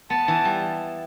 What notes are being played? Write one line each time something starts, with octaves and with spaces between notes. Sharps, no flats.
B3 A5
E3
G3